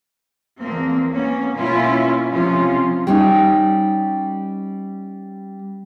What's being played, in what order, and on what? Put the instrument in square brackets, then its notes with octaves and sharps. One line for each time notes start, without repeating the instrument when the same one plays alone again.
[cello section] E2 F3 A#3 C4
A#3 B3 C#4
B2 A#3 C#4 E4 F4
C3 F3 C#4 F4
[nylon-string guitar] G3 C#4 D#4